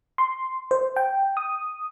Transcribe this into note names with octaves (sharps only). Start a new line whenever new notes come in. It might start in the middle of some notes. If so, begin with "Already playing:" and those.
C6
C5
G5
D#6